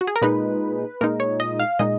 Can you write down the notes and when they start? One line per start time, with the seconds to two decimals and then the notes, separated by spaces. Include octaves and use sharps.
0.01 F#4
0.07 G#4
0.16 A#4
0.22 A#2 G#3 D#4 B4
1.01 A#2 G#3 D#4 A#4
1.20 C#5
1.40 D#5
1.60 F5
1.79 A#2 G#3 D#4 D#5